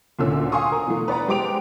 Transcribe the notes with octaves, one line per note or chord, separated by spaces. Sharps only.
D2 A#2 D3 C#4 E6
F5 F#5 G#5 C6 C#6 D#6
A#4
B2 E3 A3
B4 D5 F#5 A#5
G#3 G4 C5 D6 D7 F7